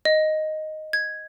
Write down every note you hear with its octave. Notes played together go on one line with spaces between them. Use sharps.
D#5
G#6